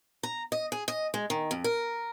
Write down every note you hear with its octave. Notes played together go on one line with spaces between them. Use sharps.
A#5
D#5
G#4
D#5
G#3
D#3
F2
A#4